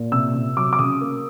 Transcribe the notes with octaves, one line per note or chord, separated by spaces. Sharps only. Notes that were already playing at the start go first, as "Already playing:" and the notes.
Already playing: A#2
C3 E6
C3
F#3 D6
D6
C#3 D#6
A#3